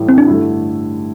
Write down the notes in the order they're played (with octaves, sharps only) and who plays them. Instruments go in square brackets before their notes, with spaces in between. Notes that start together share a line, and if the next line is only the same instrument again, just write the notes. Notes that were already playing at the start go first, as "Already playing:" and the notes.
Already playing: [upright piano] A1 A2 E3 G3
[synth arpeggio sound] C4
D4
[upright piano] G2 D3 A3 E4